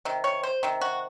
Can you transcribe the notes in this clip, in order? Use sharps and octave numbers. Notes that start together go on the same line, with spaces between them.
C3 D#3
C#5
C5
C3 D#3
F#4